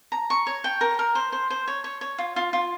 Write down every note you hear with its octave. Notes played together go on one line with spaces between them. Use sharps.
A#5
C#6
C#5
G5
A#4
A#4
C5
C5
C5
C#5
C#5
C#5
F4
F4
F4